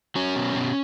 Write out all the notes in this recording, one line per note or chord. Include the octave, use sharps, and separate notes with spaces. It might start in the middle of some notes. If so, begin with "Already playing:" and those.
F#3 C#4
B2
B2